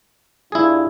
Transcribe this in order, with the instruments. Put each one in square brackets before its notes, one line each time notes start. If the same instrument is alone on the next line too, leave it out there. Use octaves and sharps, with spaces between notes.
[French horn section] G2 F4 [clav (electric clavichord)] E4 G#4